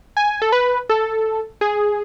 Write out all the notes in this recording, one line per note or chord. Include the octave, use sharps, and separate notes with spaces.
G#5
A4
B4
A4
G#4